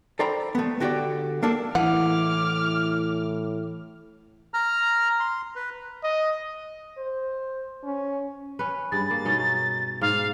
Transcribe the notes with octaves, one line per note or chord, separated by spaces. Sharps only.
A4 C5 D5 G5 A#5 B5
A3 B3
D3 F#4 G4 C5 D5
A#3 D4 A4
A2 E3 F#5 D6 F6
A#5 F6
C6
B4
D#5
C5
C#4
C#4 B4
G2 G#4 A6
A#3
B2 C#4 D#4
G#2 F5